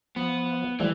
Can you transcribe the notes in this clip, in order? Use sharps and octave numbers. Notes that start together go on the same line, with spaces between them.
F3 B3
E3 F3 G3 A3